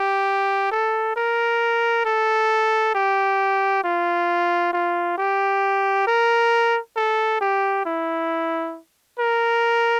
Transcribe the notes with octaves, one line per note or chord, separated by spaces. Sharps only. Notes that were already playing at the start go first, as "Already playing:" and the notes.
Already playing: G4
A4
A#4
A4
G4
F4
F4
G4
A#4
A4
G4
E4
A#4